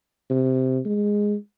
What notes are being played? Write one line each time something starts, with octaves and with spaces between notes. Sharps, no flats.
C3
G#3